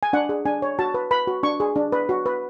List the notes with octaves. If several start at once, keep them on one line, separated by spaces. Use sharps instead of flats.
G#5
D4 F#5
G#4
D4 G#5
C#5
F#4 A5
B4
B4 B5
F#4
D4 C#6
G#4
D4
B4
F#4
B4